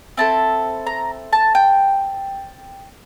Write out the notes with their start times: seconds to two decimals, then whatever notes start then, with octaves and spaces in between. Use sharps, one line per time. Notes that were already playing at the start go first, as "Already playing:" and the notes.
0.17 C4 E4 A4 A5
0.87 A#5
1.33 A5
1.55 G5